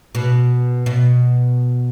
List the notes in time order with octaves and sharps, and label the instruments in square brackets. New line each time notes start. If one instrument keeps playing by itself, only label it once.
[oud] B2
B2